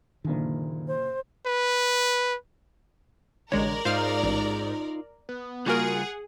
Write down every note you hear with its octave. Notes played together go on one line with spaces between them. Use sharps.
F#1 A#2 D3 D#3
C5
B4
A1 D3 G#3 A#4 C#5 D5
G#2 D#4 F4 C5 F5 F6
A1
B3
C#3 G3 A#3 F4 F#4 G#4 A#4 F#5